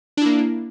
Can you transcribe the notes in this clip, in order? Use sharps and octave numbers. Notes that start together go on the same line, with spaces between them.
A#3 D4 E4